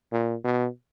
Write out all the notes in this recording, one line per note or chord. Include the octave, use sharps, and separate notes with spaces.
A#2
B2